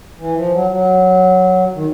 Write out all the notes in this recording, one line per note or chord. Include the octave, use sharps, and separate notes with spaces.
E3
F3
F#3
F#3
D#3